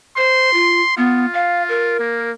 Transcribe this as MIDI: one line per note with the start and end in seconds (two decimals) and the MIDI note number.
0.17 0.52 72
0.17 0.94 84
0.53 0.81 65
0.97 1.26 59
0.97 1.97 65
1.33 1.62 77
1.69 2.31 70
2.00 2.32 58